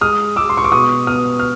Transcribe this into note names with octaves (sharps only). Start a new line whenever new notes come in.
G#3 D#6 F6
G#3 D6 E6
C6
C#6
D6
B2 C#6 D#6
B3 D#6 F6
F6